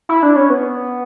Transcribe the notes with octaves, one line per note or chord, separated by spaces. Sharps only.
E4
D4
C#4
B3